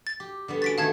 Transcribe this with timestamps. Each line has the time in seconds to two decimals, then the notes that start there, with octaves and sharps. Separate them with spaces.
0.07 A6
0.20 G4
0.48 D3 G3 B3
0.62 C#4 F#4 A6 B6 D7
0.78 D#3 A3 F5 A5 G#6